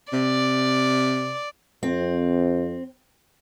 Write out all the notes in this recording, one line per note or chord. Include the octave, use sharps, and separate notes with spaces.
C3 D5
F2 C4